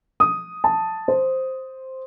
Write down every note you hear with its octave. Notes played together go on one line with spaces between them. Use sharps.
D#6
A5
C5